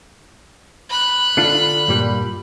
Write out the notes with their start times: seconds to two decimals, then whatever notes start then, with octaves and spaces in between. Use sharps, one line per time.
0.89 B5 F#6
1.37 D3 D4 F4
1.88 G2 A#2 G3